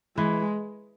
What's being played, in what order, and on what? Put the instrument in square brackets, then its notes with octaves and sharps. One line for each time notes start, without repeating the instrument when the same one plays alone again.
[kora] E3 [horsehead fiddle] G#3